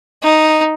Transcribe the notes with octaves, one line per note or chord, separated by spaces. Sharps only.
D#4